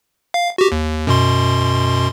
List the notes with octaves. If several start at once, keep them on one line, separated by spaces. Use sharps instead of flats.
F5
F#4 G4
D#2
F#2 B2 C6